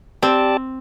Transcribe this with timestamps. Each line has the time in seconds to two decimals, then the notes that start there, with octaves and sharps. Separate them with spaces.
0.22 C4 G4 D5 A5